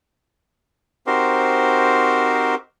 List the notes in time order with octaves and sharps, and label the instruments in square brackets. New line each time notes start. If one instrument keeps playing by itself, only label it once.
[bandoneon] C4 D#4 F#4 G4 A#4 C5